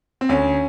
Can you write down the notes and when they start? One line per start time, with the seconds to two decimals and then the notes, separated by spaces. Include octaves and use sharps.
0.21 C4
0.29 D2 C#4